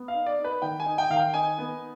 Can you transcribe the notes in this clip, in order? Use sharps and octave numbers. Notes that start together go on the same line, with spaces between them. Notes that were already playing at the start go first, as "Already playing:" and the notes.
Already playing: B3
F5
D#4
D5
D#4
B4
D#3 G5
G#5
D#4
G5
D#3 F5
G5
D#4 G#5
B3